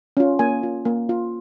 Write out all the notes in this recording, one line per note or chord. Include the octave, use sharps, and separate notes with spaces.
C#4 F4
A#3 G#5
F4
A#3
F4